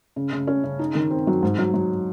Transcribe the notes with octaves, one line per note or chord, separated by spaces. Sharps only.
C#3
C#3
C#4
C#3
D#4
D#3
C4
F#3
G#2
F#3
F#3